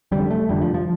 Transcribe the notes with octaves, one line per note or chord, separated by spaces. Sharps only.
F1 F2 D3 G3
A3
F1 F2 D3 G3
F3
F3